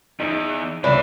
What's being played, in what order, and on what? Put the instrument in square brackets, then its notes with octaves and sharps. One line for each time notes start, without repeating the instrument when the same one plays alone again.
[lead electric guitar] E2 [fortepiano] D#4
[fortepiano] C#2 B5 [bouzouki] D4 [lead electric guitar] E4 B4